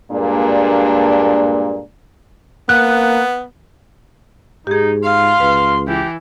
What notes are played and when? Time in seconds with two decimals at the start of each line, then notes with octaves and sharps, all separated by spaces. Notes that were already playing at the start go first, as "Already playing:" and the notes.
0.12 G2 A#2 G#3 A#3 D4
2.69 A#3 B3 F#6
4.67 G#2 D#4 G4 G#4
5.04 F5 C6
5.40 C#2 B4
5.88 E3 G4